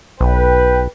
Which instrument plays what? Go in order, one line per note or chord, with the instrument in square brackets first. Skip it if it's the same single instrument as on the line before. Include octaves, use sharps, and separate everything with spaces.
[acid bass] B1 [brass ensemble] B4 G5